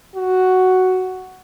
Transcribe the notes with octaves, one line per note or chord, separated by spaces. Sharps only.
F#4